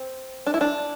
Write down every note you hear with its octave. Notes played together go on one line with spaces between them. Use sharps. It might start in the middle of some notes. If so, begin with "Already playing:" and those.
Already playing: C4
D4
E4
D4